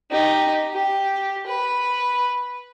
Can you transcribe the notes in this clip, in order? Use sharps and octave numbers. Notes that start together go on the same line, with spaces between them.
D#4 G4
G4
B4